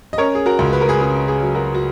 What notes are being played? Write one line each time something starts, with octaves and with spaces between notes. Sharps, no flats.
D#5
C#4 A#4 C#5
G#4
F#4 A#4
C#2
B4
A#4
G#4 B4
C#3 G#4
G#4
F#3
F#4 A#4
F#4